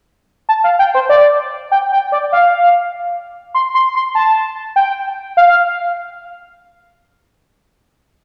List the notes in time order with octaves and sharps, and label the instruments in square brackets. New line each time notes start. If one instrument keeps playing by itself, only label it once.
[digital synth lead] A5
F5
G5
C5
D5
G5
G5
D5
F5
C6
C6
C6
A5
G5
F5